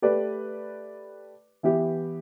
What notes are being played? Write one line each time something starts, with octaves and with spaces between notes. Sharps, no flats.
A3 G4 B4 D5
E3 B3 E4 G4